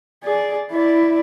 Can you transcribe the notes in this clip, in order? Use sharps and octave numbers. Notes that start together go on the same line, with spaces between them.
G#4 D5
E4 D5